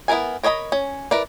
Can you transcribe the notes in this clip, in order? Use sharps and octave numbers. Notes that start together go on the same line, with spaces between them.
B3 E4 F4 A#4 G#5
A#4 C#5 D#5 A#5 B5
C#4
E4 A#4 B4 D5